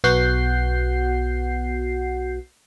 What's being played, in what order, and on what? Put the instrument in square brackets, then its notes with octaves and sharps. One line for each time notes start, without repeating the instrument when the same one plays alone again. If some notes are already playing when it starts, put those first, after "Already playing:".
[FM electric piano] B1 B3 F#4 F#5 G6 C7